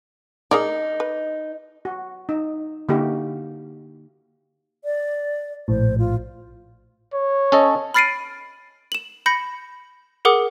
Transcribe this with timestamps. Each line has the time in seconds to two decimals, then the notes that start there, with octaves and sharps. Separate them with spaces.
0.51 D#4 G#4 A#4 D5
1.00 B4
1.85 F#4
2.29 D#4
2.89 D3 A#3 D#4 E4 F#4 G4
4.84 D5
5.68 A#1 A2 C5
5.98 F4
7.14 C#5
7.52 C#4 A4 D#5
7.94 B5 F6 A6 C7 D7 D#7
8.92 E7 F#7
9.26 B5 G6 A#6 C#7
10.25 G#4 A#4 F#5 D6 D#6